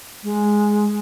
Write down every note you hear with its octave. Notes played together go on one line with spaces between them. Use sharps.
G#3